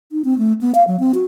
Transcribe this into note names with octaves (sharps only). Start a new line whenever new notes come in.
D#4
C4
A3
B3
F5
F#3
C4
F#4